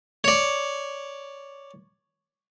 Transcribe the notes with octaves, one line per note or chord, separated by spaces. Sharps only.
C#5 D5